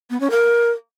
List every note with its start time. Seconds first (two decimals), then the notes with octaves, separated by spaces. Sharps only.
0.10 B3
0.20 C#4
0.30 A#4